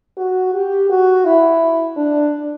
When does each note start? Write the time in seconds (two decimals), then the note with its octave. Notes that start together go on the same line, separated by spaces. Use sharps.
0.17 F#4
0.54 G4
0.90 F#4
1.25 E4
1.96 D4